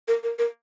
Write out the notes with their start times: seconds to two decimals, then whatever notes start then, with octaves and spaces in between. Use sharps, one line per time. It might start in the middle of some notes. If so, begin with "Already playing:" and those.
0.08 A#4
0.23 A#4
0.39 A#4